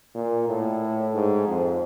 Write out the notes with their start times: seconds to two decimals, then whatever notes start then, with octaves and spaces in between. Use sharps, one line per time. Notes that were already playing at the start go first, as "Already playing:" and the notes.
0.15 A#2
0.48 A2
1.14 G#2
1.47 F2